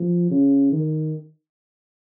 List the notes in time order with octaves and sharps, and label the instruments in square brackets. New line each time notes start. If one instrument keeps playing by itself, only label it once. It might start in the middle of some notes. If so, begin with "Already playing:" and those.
Already playing: [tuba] F3
C#3
D#3